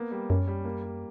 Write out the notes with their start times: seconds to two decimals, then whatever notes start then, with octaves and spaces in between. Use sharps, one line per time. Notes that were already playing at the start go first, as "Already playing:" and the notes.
Already playing: A#3 B3
0.11 G3
0.30 F#2 C#4
0.48 G3
0.65 A#3
0.83 G3